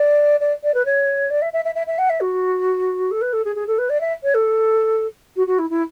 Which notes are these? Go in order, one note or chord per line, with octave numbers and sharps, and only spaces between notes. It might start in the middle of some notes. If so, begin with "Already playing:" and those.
Already playing: D5
D5
D5
B4
C#5
D5
E5
E5
E5
E5
E5
F#5
E5
F#4
A4
B4
A4
G#4
G#4
A4
B4
D5
E5
C#5
A4
F#4
F#4
E4
E4